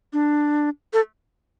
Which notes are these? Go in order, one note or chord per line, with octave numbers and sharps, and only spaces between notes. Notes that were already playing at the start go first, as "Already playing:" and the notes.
D4
A4